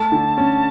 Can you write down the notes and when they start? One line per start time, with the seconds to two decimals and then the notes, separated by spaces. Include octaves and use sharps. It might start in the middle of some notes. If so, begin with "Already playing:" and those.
Already playing: A3 A5
0.12 D3
0.38 C#4